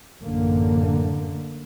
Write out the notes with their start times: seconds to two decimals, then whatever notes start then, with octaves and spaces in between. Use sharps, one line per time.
0.23 A1 F#2 D3 A#3